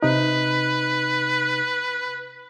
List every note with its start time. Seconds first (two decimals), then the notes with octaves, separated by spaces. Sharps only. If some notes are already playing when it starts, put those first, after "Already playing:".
0.03 C3 D#4 B4